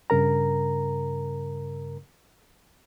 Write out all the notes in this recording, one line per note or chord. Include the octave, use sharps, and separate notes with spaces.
G2 C#3 A#4 A#5